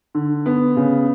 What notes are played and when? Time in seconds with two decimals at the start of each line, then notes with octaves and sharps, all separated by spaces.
0.15 D3
0.46 B3
0.77 C#3